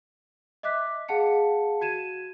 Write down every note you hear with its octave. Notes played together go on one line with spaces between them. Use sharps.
D#5 E5 D6 F#6 B6
G#4 F5 F#5 A5 C#7
F#4 G#6 D#7 E7